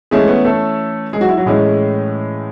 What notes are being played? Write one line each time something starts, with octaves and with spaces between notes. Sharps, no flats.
E3 G#3 A3 C#4 G#4
B3 B4
A3 A4
G#3 G#4
F#3 F#4
E4
F#3 F#4
A2 E3 G#3 A3 C#4 G#4